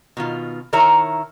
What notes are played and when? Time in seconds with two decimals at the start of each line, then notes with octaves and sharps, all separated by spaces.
0.17 B2 D#3 F4
0.73 D#3 E4 A#4 C#5 E5 A#5